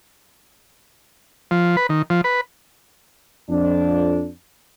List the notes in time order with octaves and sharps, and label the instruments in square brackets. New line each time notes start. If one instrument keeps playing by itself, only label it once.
[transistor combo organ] F3
B4
D#3
F3
B4
[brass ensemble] F2 D4